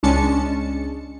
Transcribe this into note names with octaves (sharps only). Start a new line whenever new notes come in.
C#2 G#3 C#4 D4 A5 C#7